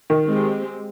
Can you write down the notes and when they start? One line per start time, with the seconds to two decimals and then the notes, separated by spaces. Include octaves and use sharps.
0.10 D#3
0.27 G#3 C4 G4